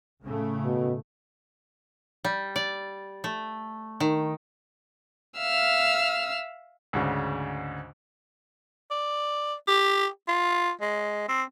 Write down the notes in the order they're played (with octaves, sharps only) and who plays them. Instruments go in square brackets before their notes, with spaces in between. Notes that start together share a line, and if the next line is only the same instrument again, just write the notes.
[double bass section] A2 C#3 A3
[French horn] B2
[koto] G3
D5
A3
D#3
[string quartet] E5 F5 E6 F6
[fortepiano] D2 G#2 C#3
[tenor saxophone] D5
G4
F4
G#3
C4